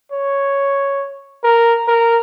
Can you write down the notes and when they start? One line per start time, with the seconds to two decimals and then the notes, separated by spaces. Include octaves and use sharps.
0.12 C#5
1.44 A#4
1.88 A#4